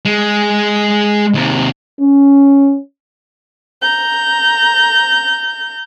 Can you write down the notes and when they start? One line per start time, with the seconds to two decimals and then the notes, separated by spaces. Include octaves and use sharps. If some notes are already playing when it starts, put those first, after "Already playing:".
0.05 G#3
1.34 D#2 C3
2.00 C#4
3.82 A#5 G6